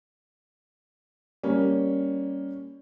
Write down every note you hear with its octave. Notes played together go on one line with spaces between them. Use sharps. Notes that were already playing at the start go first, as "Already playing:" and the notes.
G3 A#3 C#4